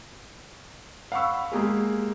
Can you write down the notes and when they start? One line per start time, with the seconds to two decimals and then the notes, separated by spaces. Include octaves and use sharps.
1.12 F5 F#5 B5 C#6 E6
1.52 G#3 A#3 G4 G#4